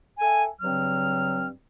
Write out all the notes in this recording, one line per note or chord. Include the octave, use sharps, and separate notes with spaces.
A4 E5 G5 G#5
G2 C#3 F#3 C4 F6